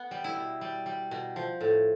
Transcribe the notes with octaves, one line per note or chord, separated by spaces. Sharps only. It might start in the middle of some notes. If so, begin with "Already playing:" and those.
Already playing: B3
G3
E4
B2
G3
G3
B2
F3
A2